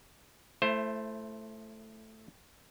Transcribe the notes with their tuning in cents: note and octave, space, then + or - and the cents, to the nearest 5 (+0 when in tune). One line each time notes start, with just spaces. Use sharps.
A3 +0 E4 +30 C5 +15